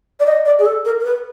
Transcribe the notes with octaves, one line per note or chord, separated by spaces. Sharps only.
D5
D#5
D5
G#4
A4
A#4
A#4
B4